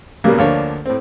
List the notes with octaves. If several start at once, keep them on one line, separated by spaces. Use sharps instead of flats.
A#2 C#3 F#3 G3 A#3 B3
D2 F3 A#3 D4 C#5
A2 C4